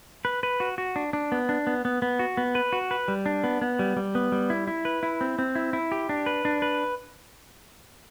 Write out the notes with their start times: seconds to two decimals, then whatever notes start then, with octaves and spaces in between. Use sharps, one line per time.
0.25 B4
0.43 B4
0.60 F#4
0.78 F#4
0.96 D4
1.13 D4
1.32 B3
1.49 D4
1.67 B3
1.85 B3
2.02 B3
2.19 F#4
2.37 B3
2.55 B4
2.73 F#4
2.91 B4
3.08 G3
3.26 D4
3.44 B3
3.62 B3
3.79 G3
3.97 G3
4.15 B3
4.32 G3
4.50 E4
4.67 E4
4.85 B4
5.03 E4
5.21 C4
5.39 C4
5.55 E4
5.73 E4
5.92 G4
6.09 D4
6.26 B4
6.45 D4
6.62 B4